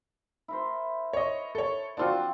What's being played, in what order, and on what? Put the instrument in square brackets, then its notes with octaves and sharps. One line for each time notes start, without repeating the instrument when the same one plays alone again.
[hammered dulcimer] E4 A#4 C5
[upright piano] C#5 D#5
A4 C#5
[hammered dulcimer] F3 C4 C#6 [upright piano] D4 F4 F#4